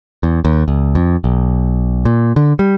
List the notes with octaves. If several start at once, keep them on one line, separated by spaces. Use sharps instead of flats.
E2
D#2
C#2
F2
B1
A#2
D3
G3